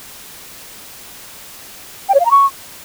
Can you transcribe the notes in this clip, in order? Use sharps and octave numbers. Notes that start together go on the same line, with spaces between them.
G5
C#5
F5
A#5
C#6